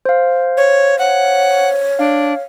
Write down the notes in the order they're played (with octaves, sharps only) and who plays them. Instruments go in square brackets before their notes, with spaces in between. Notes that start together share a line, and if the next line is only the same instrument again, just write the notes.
[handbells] C5 F5
[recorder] C#5
[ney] C#5 [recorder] F#5
[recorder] D4 [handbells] F5